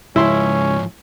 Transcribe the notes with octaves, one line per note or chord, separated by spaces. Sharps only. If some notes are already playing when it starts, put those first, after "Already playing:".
C#2 G#2 F3 C#4 E4 C6